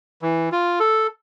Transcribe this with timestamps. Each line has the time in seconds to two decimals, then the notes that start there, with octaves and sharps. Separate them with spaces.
0.22 E3
0.52 F4
0.80 A4